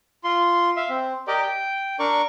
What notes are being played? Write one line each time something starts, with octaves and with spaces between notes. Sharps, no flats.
F4 C6
E5 F5
C4
G4 A#4 D5 D#5 G5
G5
D4 A#4 D5 C#6